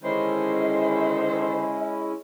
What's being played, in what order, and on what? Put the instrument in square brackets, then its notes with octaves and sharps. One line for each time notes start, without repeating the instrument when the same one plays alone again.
[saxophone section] D3 D#3 C5 [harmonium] G#3 C#4 E4 [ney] D#5